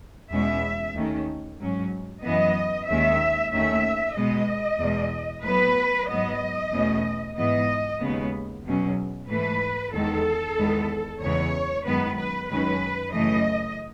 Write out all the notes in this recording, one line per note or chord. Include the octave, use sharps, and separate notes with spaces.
E2 B2 G#3 C#4 E5
D#2 D#3 A3 C#4
G#2 F#3 C#4
F#2 E3 B3 D#5
D#2 D#3 G#3 C#4 E5
D#2 D#3 A3 C#4 E5
B2 G#3 B3 D#5
E2 B2 G#3
A2 F#3 B3 B4
G#2 F#3 B3 D#5
E2 B2 A3 C#4
G#2 E3 G#3 B3 D#5
D#2 C#3 G#3 B3
E2 B2 F#3 C#4
G#2 E3 A3 B4
E2 D#3 G#3 B3 A4
E2 D#3 G#3 B3
E2 C#3 E3 G#3 B3 C#5
F#2 D#3 G#3 B3 B4
B4
F#2 D#3 G#3 C#4 B4
F#2 C#3 E3 A3 D#5